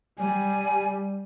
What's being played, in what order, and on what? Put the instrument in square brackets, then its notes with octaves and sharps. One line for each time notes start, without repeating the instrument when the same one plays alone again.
[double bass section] G3 [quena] G#5